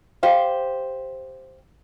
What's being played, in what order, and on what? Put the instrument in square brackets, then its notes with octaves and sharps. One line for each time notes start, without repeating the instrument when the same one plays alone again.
[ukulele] G4 C5 F5